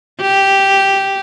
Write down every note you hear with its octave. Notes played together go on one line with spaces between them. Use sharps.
G4